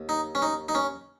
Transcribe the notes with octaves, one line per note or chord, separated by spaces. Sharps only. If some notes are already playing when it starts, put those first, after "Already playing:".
Already playing: D#2
D#4
C#4
D#4
D#4
C#4